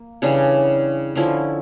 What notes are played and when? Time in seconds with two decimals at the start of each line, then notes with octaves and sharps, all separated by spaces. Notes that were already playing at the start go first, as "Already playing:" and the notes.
Already playing: A#3
0.22 C#3 E3 G3 D4
1.16 D3 F3 C#4 E4